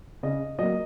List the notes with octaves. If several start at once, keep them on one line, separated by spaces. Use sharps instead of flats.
C#3 D#5
F#3 A#3 D#5